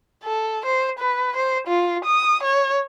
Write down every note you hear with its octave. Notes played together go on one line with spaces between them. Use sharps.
A4
C5
B4
C5
F4
D#6
C#5